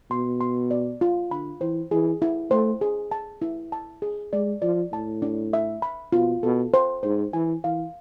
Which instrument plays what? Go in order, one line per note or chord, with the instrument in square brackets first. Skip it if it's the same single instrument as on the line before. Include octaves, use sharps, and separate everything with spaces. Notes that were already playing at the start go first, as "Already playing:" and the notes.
[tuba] B2 [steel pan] C6
[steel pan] C6
D5
F4
[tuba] D3 [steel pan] B5
[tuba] E3 [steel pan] C5
[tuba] E3 [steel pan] G#4
[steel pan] E4
[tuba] A3 [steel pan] C5
[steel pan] G#4
A5
E4
A5
G#4
[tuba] G#3 [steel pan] D5
[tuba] F3 [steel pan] D5
[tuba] A2 [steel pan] A5
[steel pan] D4
E5
B5
[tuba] B2 [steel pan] F4
[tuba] B2 [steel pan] A4
[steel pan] C5
[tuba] G#2 [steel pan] C5
[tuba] E3 [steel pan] G#5
[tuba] E3 [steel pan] F5